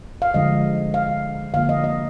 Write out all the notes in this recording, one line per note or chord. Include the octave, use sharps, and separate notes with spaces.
F5
D3 F3 G#3 D#5
F5
D3 F3 A#3 F5
D#5
D#5